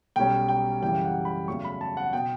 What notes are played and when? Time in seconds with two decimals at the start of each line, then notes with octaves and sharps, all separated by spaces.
0.16 B1 B2 G3 C#4 G5
0.49 G5
0.82 F#2 C#3 E3 G3 G5
1.04 F#5
1.25 B5
1.48 E2 C#3 F#3 A3 C#4 C#6
1.65 B5
1.81 A5
1.97 F#5
2.13 B2 G5